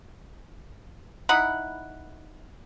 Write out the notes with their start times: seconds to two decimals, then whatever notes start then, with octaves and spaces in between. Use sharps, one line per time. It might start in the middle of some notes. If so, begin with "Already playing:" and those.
1.29 D#4 E4 F#5 B5